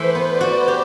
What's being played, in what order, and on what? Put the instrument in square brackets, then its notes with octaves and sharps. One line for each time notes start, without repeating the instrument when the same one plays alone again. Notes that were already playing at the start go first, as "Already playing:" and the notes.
Already playing: [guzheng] E3 A3 [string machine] B4 C5
[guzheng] B3
[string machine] D5
[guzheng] F#4
G4